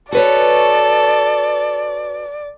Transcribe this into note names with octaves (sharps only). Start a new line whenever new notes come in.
F#4 A4 B4 C#5 D5